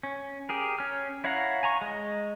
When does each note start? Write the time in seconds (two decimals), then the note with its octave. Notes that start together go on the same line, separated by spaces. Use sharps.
0.03 C#4
0.49 G4 G#4 A#4
0.79 C#4 F6
1.24 E4 C#5 F5 F#5 A#5
1.63 G#5 A#5 C#6
1.81 G#3 D#5